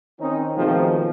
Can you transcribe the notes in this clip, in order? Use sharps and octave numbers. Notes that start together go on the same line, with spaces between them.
D#3 C4 C#4 D#4
B2 D#3 F3 G#3 A3 C4